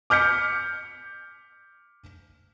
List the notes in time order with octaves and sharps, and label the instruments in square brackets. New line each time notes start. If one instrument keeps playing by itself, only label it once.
[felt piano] D6 F6 G6 B6 C#7